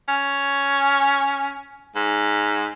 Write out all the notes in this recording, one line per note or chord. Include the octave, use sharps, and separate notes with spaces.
C#4
G#2